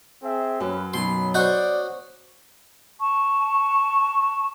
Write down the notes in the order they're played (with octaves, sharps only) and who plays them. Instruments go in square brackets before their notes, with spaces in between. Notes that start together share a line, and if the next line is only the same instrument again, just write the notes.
[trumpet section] C4 G#4 E5
[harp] F#2 [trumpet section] C#4 B4
[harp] B2 F#3 [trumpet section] D#4 B5 [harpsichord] C6
[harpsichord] F#4 D#5 [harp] C5 C#6 G6 [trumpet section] D5
[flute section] A5 C#6